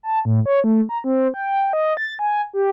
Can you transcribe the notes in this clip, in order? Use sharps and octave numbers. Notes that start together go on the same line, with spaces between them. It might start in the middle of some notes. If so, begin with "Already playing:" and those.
A5
A2
C#5
A3
A#5
C4
G5
D#5
A6
G#5
G4